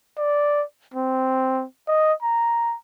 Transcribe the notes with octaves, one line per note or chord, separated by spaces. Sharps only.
D5
C4
D#5
A#5